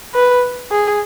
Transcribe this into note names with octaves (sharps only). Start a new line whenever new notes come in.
B4
G#4